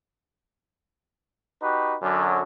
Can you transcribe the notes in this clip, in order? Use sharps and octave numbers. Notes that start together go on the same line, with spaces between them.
D#4 F#4 G4 B4
F#2 D3 F#3